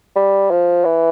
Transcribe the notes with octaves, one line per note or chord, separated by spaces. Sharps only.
G3
F3
E3